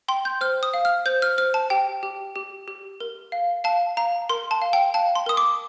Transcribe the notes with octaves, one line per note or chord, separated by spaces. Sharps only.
G5 C6
G6
C5 F6
D#6
F5
F6
C5 G6
F6
C5 F6
A5
G4 G5
G4
G4
G4
A#4
F5
F5 A5
F5 A#5
A#4 C6
A5
F5
G5
F5 A5
C6
A#4 D#6
D6